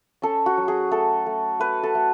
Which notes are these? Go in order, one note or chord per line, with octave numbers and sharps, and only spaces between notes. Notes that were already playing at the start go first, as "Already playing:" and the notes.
C#4 A4
F#4
F#3
G#4
A3 A4
A3
A3 B4
A4
A3